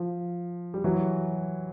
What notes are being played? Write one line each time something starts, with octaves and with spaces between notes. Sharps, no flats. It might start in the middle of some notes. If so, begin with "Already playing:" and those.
Already playing: F3
G3
E3 F#3